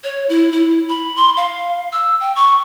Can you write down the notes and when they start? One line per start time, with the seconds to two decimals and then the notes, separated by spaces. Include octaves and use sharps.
0.04 C#5
0.29 E4
0.52 E4
0.89 B5
1.16 C6
1.37 F5
1.92 E6
2.20 G5
2.36 C#6